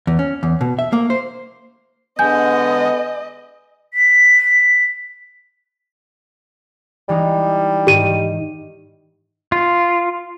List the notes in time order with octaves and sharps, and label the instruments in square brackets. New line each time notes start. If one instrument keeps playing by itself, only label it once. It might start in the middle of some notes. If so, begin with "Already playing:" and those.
[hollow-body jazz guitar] E2
C#4
E2
B2
E5
A#3
C5
[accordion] D3 G#3 [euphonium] B3 [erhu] D#5 [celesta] G#5 G6
[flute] B6
[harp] E3 G#3 D#4 [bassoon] G3
[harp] G#2 D#3 [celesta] G4 D#7
[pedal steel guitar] F4